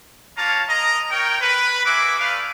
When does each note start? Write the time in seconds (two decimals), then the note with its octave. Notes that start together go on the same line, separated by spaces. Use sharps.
0.37 A#3 F4 C#5 F5 A5 A#5
0.69 A#4 D#5 A#5
1.11 A#4 C#5 G5
1.41 B4
1.85 A#3 E4 F#4 G#4 E5 D6
2.19 A3 B4 D5 F5